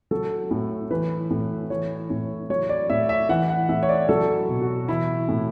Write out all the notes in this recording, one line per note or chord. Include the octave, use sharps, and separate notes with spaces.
F#3 A4
A2
E3 B4
A2
E3 C#5
A2
F#3 C#5
D5
A2 E5
E5
E3 F#5
F#5
A2 E5
C#5
D5
F#3 A4
B2
F#4
E3 E4
A2